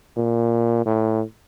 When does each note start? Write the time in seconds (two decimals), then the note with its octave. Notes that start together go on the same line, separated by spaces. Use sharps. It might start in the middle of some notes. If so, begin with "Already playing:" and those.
0.16 A#2
0.86 A2